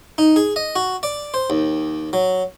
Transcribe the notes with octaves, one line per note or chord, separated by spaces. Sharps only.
D#4
G#4
D#5
F#4
D5
C5
D#2
F#3